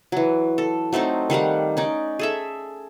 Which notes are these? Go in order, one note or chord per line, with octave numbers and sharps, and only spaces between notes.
E3 F#3
A4
F#3 A3 C4 D#4
D#3 G3 F5 F#5
C#4 D#4 D5
G#4 A4 E5